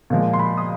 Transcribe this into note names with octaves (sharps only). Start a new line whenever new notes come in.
A#2 F3 G#3
C6
B5
D#6